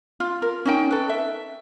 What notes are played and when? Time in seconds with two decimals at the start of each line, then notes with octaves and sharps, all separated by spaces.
0.20 F4
0.42 A#4
0.65 C#4 D#4 G5
0.91 A4 B4
1.09 E5